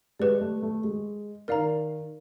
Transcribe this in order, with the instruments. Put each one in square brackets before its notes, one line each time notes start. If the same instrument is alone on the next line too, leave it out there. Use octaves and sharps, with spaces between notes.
[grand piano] G#3 [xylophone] G4 B4 D5
[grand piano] A3
A3
G#3
[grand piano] D#3 [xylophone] A#4 D5 F5 A#5